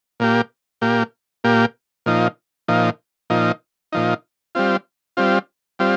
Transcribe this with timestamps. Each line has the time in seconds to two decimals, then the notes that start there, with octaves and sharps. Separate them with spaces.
0.20 A#2 A#3 G4
0.81 A#2 A#3 G4
1.44 A#2 A#3 G4
2.06 A#2 F3 D#4
2.68 A#2 F3 D#4
3.30 A#2 F3 D#4
3.92 A#2 F3 D#4
4.55 G3 C4 F4
5.17 G3 C4 F4
5.79 G3 C4 F4